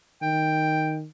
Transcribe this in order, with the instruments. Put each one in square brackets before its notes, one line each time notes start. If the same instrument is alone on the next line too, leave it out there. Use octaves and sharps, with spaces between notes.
[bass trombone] D#3 [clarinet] G5